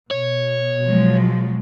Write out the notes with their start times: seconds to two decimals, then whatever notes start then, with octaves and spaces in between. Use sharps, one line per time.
0.11 B2 C#5
0.85 F3 F#3 G#3